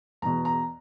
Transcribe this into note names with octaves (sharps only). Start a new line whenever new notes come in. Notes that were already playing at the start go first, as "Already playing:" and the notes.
E2 B2 A#5
A#5